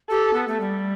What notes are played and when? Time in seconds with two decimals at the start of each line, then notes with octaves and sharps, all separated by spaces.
0.09 G4 A4
0.33 B3
0.48 A3
0.60 G3